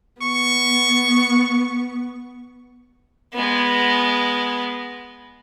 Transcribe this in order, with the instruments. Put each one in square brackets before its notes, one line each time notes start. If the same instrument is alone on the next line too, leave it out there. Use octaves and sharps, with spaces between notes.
[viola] B3 [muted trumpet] C#6
[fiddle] G#3 B3